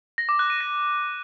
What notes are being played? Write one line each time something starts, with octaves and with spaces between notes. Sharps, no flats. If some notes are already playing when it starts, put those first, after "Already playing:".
A#6
D6
F#6
D#7
A#6